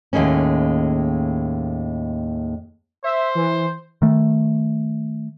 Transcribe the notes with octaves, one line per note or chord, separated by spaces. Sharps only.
D#2 A2 G#3 A#3 C#4
C5 E5
E3
D#3 A3